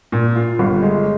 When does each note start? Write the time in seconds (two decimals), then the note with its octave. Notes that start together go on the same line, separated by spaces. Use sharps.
0.12 A#2
0.36 F4
0.59 G1
0.82 G#3